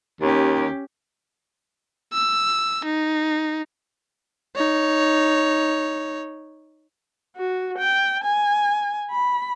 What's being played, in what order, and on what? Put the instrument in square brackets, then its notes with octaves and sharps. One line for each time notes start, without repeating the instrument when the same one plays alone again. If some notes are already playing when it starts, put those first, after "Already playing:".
[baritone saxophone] D#2 [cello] C#4 G4
[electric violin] E6
D#4
D#4 C#5
[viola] F#4
G5
G#5
B5